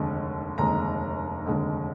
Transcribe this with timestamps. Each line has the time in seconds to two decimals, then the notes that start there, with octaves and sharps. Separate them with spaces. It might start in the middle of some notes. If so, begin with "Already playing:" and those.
Already playing: F1 D#2 D3 G#3
0.58 F1 D#2 D3 G#3 A#5
1.45 F1 D#2 D3 G#3